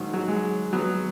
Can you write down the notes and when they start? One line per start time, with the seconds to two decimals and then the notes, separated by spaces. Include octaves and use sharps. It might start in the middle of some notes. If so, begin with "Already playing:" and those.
Already playing: G#2 D#3 F#3
0.13 F#3
0.28 G#3
0.73 F#3 B3